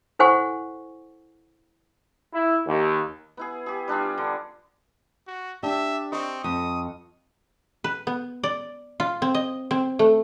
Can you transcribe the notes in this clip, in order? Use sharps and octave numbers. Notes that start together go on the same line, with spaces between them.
E4 A4 C5 F#5 G#5 C#6
E4
D#2
B3 E4 G#4
G4 G#4
G3 D4 F4 G#4
D3
F#4
D4 G4 E5
C4 D#5 C#6
F2 D#6
B4
B3
D5
F4
C4
D#5
C4
A3